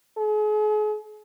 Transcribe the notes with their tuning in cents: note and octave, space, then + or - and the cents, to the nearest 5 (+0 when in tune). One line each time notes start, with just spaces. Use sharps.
G#4 +40